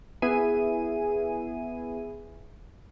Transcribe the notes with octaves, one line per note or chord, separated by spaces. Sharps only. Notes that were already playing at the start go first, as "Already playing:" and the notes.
B3 E4 G#4 D#7